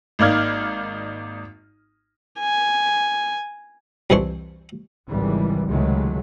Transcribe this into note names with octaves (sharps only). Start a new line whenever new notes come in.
G#1 A#3 D#4 D5 F6 G#6
G#5
C2 F2 E3 D4 C5 C#6
G#1 C#2 E3 G3
C#2 C3 D#3 F#3 G#3 A3